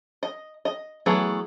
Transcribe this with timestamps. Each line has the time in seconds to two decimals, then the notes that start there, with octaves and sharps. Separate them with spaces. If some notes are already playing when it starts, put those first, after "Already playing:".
0.23 D#5
0.65 D#5
1.06 E3 F#3 A3 B3 G#4